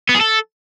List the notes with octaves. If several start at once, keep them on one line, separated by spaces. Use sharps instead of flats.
B3
G#4
A4